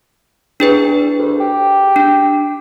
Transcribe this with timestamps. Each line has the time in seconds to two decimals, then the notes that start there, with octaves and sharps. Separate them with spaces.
0.60 E2 D4 G#4 B4
1.19 D2
1.40 G4
1.96 D4